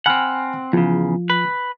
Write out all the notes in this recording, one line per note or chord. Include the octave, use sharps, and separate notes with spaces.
C4 F#5 G#5 B5 F6
E2 C#3 F3 F4
B4